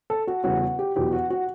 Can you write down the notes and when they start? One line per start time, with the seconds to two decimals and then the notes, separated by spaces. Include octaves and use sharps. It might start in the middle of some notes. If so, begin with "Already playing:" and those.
0.10 A4
0.27 F#4
0.44 E2 C#3 G3 C#4 F#4
0.62 F#4
0.79 G4
0.96 E2 B2 F#3 G4
1.13 F#4
1.30 F#4